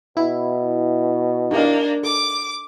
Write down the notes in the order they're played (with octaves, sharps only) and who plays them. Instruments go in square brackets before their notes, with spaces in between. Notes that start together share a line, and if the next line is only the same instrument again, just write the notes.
[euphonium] B2 [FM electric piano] E4
[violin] A#3 D4 [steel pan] D#4 G4 F5
[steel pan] A4 [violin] D6